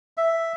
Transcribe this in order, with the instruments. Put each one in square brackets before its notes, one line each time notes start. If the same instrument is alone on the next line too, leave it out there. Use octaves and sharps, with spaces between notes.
[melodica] E5